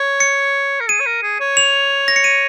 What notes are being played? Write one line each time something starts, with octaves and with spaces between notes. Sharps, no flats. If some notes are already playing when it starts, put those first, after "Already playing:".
Already playing: C#5
C#7
A#4
G#4 D#7
C#5
A#4
G#4
C#5
F7
A#6
C#7
D#7